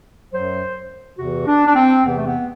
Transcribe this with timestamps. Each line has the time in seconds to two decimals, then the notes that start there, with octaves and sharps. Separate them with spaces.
0.32 F#2 F#3 C5
1.18 E2 C3 E3 F#4
1.47 D4
1.67 D4
1.75 C4
2.04 E2 C3 E3 B3
2.15 A3
2.26 B3